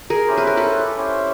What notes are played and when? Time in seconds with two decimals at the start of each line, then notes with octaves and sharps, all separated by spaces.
0.10 G#4 A#4
0.27 C#4 E4 G4 C5
0.37 B4
0.47 A#4
0.57 A4 B4
0.97 C#4 E4 G4 C5